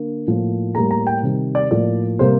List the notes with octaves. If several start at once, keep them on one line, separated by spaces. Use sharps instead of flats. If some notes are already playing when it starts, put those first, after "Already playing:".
Already playing: D3 A#3
A2 F3 A#3
A2 G3 A#3 A#5
A#5
G5
C3 D#3 G3
D5
A2 F3 A#3 D5
C3 G3 A#3 C5